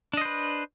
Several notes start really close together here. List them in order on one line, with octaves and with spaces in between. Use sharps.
D4 D#5 C5 B4